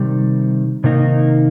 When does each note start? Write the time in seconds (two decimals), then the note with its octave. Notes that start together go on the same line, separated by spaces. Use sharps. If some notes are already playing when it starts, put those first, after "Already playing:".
Already playing: C3 D#3 G3
0.84 C3 D#3 A#3 D#4